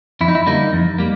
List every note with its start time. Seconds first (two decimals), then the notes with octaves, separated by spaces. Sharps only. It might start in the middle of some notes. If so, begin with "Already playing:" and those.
0.21 F2 E4
0.28 D#4
0.35 E4
0.46 D3 G3 A#3 D#4
0.73 F2
0.99 G3 A#3